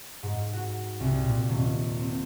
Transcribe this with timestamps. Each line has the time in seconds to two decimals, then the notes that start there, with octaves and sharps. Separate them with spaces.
0.23 G#2
0.53 F#4
1.00 C2
1.23 A#2
1.49 D#1
2.00 C4